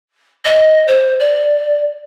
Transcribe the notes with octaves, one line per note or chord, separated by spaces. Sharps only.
D#5
C5
D5